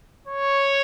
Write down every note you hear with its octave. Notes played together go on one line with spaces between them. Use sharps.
C#5